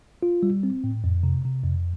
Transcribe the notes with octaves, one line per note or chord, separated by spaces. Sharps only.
F4
G3
C4
A2
F2
C3
C3
F2